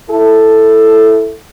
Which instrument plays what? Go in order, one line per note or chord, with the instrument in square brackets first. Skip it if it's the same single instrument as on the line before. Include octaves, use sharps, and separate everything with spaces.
[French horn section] E4 A4